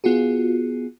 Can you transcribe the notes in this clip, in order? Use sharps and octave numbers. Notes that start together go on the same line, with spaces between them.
B3 F4 F#4 G#4